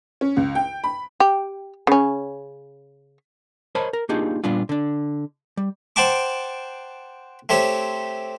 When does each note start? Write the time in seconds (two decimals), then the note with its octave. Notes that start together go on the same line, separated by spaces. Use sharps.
0.21 C#4
0.37 C#2
0.55 G5
0.84 B5
1.20 G4
1.87 C#3 C#4
3.75 A#4 C5 C#5 D#5 A5 B5
3.93 A#4
4.09 A#3 D4 D#4 F4 G4 G#4
4.44 A#2 G3 B3 D4 F4
4.69 D3 D4
5.57 G3
5.96 C5 F#5 G5 A5 C#6 D6
7.49 A3 C4 G4 C#5